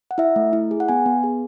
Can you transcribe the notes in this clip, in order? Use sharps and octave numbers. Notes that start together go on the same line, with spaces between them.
F#5
E4 E5
A3
E4
G#4
F#5
B3 G#5
B3
G#4